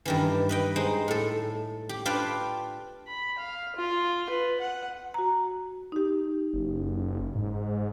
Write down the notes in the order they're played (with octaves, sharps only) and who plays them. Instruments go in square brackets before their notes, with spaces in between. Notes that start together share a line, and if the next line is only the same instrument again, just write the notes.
[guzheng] G2 D#3 E3
B4 D#5 G5
G#3 D#4 C5
A2 A4
G4
D4 F4 B4 F5 G5
[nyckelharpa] B5
F5
F4
B4
F#5
[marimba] F#4 A#5
D#4 G4
[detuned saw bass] F#1
G#2